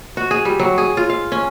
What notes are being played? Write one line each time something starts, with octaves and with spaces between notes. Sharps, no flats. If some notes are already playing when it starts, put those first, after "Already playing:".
F#4
G#4
G3
F#3
G#4
F4
F5
C#4